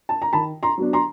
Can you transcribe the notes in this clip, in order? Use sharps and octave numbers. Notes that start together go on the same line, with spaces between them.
A5
A#5
D#3 A5 B5
A#5 C6
F#3 B3 D4
A#5 C6